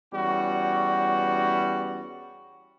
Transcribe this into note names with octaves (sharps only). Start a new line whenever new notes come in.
E2 G3 C#4 F#4